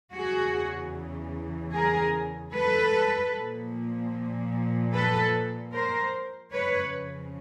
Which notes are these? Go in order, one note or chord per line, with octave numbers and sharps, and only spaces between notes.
E2 C#3 E3 F#4 G#4
G#4 A#4
A4 B4
A#2 F3
A4 B4
A#4 C5
F2 C#3 F3 B4 C#5